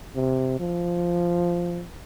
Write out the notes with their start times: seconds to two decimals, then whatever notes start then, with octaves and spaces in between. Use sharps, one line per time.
0.15 C3
0.60 F3